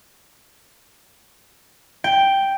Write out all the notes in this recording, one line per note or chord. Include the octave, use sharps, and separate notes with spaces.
G5